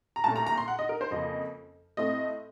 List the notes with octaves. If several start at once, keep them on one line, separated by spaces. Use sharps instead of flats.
A#5
C2 A#2 A3 C#4 A5
A#5
A#5
C6
F#5
D#5
A#4
C5
F2 C#3 F3 A#3 D#5
A2 A3 C4 D#5